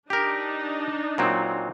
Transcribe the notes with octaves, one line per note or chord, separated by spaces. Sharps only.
D4 D#4 G4 A#4
A#2 F#3 C4